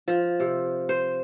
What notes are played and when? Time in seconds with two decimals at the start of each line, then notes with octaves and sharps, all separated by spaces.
0.08 F3
0.40 C3
0.89 C5